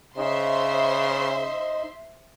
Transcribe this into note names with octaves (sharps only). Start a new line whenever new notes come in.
C#3 D#4 C5 D#5 E5 C6